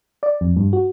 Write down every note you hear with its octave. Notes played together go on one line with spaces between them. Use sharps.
D5
F2
G2
F#4